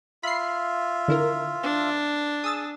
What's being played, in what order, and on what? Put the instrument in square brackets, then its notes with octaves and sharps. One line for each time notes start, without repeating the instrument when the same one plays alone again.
[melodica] F4 E5 [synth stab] B5 C7
[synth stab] D3 E4 A#4
[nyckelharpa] D4
[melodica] G#4 [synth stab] D#6 E6 A6